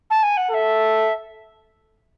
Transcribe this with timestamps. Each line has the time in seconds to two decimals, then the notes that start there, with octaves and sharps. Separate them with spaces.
0.10 A5
0.23 G#5
0.37 F#5
0.50 A4 F#5
0.54 E5